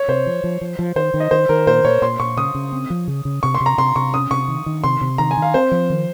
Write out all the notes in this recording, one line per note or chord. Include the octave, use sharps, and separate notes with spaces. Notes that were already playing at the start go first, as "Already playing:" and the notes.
Already playing: C#5
C3 C5
F3
F3
F3
F3
D#3 C5
D#3
D#5
D#3 C5
D#3 A#4
A#2 C5
A#2 C#5
A#2 C6
A#2 C#6
C#3 D#6
C#3
C4
F3
C#3
C#3
C3 C#6
C6
C3
A#5
C3 C6
C3 C#6
C#4 D#6
C3 C#6
D#3
D#3
C3 C6
C3
D#3 A#5
G#5
D#3
F5
C4 C5
F3
D#3